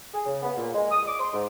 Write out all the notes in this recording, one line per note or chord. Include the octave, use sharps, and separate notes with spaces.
G#4
C#3
B3
A#2
G#3
D#6
D6
C6
G#2